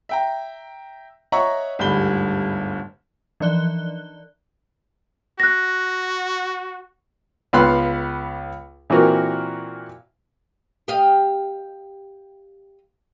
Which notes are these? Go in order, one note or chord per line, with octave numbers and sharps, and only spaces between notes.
E5 G5 A#5
C#5 D#5 E5 F#5 A#5 C#6
G1 D2 G#2 G3 B5 G7
E3 F3 D5 F#6 G7
F#4 F#6 A#6
C#2 B3 F5 B5 C6 F#6
A#2 E3 C4 F#4 A#4
G4 D#5 F5